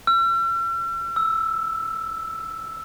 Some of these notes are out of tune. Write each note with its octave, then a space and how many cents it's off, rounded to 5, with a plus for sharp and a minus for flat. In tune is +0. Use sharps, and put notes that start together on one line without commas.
E6 +45
E6 -5